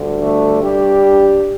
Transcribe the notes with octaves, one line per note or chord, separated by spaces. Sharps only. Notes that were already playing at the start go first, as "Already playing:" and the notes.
Already playing: D2 D3 G3
A3 D4
G2 G3 D4 G4